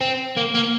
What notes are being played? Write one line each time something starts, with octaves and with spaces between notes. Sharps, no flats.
C4
A#3
A#3